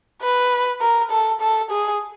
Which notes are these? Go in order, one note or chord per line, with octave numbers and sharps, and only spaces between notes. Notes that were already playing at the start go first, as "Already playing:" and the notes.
B4
A#4
A4
A4
G#4